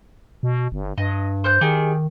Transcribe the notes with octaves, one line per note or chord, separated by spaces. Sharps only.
B2
G1
G2 D#5
C5 F#6 G6
D#3 D#4 G4 G#4